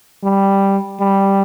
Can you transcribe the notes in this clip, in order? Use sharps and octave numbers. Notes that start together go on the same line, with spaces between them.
G3
G3